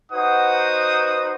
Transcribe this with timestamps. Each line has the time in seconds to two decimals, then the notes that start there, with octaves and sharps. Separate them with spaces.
0.12 D#4 F#4 B4 C5 F#5 D#6